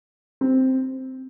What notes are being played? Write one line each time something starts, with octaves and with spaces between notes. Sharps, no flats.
C4